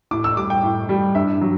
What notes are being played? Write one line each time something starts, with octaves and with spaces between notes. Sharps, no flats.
A2 D6
E6
G3 D6
G5
A2
G3
G2 E5
F#3